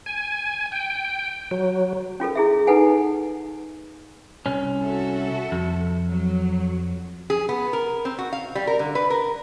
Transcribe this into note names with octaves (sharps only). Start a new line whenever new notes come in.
G#5
G5
F#3
C#4 F4 A4 A#4
E4 G#4 E5
D#4 A4 B4 F#5 G#5
C2 C#4
F#4 A4 E5
F2
F#3
G#4
B3
A#4
C4
F#4
F5
G3
A#4
D3
B4
A#4